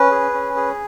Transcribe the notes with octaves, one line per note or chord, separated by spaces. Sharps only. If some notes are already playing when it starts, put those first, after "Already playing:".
Already playing: C#4 B4
G#4
C#4
G#4